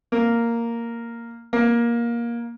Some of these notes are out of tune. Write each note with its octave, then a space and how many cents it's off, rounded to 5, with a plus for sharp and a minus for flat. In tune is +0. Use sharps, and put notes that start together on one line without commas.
A#3 -5
A#3 +15